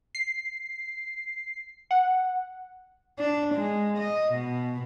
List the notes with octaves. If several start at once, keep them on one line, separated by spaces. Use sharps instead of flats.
C7
F#5
D4
G#3
D#5
B2